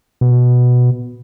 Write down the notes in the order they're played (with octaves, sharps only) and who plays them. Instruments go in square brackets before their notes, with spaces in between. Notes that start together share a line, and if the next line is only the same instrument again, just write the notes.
[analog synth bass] B2